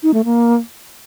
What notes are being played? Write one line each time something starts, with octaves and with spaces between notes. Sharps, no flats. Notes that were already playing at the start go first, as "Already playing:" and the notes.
D#4
A3
A#3